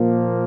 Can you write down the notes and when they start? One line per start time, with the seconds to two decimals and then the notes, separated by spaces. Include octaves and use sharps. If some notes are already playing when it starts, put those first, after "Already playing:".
Already playing: A#2 F3 A#3